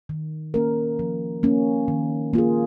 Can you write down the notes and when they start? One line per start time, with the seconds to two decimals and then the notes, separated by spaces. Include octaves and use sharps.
0.09 D#3
0.54 A#3 C#4 A#4
0.99 F3
1.43 A#3 C#4
1.88 D#3
2.33 A#3 F4 G#4